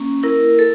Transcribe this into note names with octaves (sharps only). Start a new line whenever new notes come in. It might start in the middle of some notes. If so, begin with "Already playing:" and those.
Already playing: A#3 C#4
E4 A#4
A4